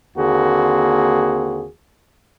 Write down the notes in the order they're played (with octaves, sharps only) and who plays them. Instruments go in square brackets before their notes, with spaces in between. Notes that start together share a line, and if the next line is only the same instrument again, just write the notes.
[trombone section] D#2 D3 A#3 C4 F#4 G#4